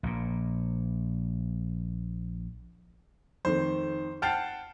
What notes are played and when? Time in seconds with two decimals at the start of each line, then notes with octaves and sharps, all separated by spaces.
0.03 A#1 A#2
3.45 F2 D#3 A3 C5
4.22 F#5 G5 A5 F6 A6 C7